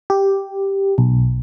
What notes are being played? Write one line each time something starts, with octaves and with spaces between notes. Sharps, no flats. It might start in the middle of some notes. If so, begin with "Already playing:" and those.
G4
B1